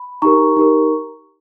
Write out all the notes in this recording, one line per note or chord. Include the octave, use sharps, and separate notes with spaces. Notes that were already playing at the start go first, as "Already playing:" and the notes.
Already playing: B5
D#4 G4 A#4 A#5 C#6
D#4 G4 A#4